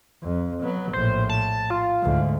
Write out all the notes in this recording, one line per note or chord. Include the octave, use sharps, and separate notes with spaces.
F2
F#3 B3
A#1 A2 C5
A5
F4
D2 G#2